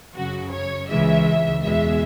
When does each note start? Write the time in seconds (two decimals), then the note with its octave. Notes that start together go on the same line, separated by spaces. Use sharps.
0.15 F#2 C#3 F#3 F#4
0.52 C#5
0.88 C#2 C#3 E3 G#3 E5
1.61 E2 B2 G#3 E5